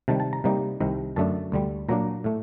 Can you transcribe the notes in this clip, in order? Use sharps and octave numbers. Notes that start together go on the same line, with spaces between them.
C3 D#3 G3 A5
A5
A#5
C3 G3 A#3 D#4
C2 C3 D#3
F#2 D3 A3 D4 A5
D2 D3 G3
A#2 F#3 A#3 D4 A#5
A2 A3